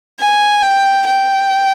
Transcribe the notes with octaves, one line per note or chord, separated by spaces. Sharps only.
G#5
G5
G5